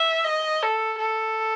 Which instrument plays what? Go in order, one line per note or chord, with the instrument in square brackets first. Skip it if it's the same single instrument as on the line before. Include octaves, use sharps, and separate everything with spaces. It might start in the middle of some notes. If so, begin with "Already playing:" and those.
Already playing: [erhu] E5
D#5
A4
A4